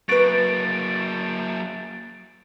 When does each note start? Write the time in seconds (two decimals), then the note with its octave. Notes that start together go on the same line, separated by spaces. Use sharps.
0.09 F#3 A#3 F#4 B4 A6 D7